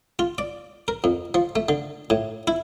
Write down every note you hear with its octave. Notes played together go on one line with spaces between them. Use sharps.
F4
D5
A#4
F2
F3
A3
D3
A2
E4